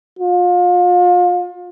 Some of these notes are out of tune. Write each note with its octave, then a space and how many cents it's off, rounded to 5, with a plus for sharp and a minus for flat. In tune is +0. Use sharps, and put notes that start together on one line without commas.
F4 +35